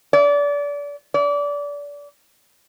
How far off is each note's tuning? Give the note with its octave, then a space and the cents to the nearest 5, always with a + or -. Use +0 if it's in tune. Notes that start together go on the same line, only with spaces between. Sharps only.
D5 -30
D5 -25